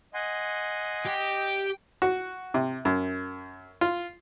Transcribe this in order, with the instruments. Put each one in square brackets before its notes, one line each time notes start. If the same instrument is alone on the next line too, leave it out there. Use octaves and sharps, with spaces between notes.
[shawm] D#5 [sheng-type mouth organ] F#5 G#5 C6
[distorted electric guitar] G4 [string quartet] G5
[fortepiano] F#4
C3
F#2
F4